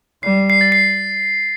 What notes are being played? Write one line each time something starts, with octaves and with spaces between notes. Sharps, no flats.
G3 C7
C7
A6
C7